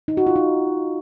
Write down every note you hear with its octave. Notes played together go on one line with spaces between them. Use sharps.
D#4
F#4
F4
D#4